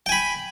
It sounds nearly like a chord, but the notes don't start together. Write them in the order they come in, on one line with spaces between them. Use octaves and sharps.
G5 G#5 B5